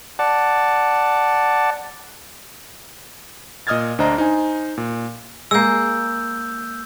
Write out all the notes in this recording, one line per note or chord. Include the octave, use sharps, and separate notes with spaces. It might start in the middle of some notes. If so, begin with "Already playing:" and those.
D5 F#5 A5
A#2 D#5 D#6 F6 G#6 A6
D2 D4 C5 D#5 A#5
D#4 C5 G#5
A#2
G#3 A#3 E6 G6